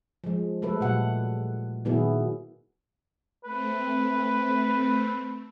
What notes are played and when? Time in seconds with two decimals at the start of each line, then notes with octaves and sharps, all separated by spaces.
0.24 F3 G#3
0.62 F#3 G#3 A3 A4 B4
0.81 A#2 F#3 G3 F#5
1.85 A#2 D#3 F#3 B3 E4 G#4
3.44 A3 C4 B4